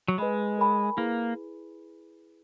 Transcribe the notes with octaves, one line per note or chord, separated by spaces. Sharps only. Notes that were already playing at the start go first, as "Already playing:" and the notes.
F#3
G#3 B4 D#5 G#5 B5
A#4 C#5 G#5 B5
A#3 E4 G#4 B4